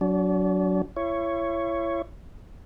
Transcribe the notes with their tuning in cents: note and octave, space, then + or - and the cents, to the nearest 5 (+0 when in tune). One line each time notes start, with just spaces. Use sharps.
F#3 +5 D4 -35
E4 +35 C#5 +0